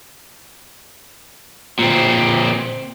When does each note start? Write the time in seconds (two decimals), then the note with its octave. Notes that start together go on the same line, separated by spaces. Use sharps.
1.79 A#2 C4